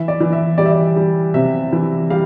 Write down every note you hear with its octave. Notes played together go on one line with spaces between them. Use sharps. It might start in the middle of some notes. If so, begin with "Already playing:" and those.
Already playing: E3 E5
D5
E3
E5
G3 D5
E5
D5
G3
C3 E5
E3
G3 F5